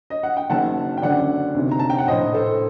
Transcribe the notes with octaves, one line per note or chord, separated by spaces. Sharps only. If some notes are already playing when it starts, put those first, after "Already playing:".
D#5
F#5
G5
F#1 F#2 D#3 F#5 A5
G5
F#1 F#2 D3 D5 F#5
D2 C3 D#3
A#5
A5
G5
F#5
A#1 A2 C5 D#5
A4 C5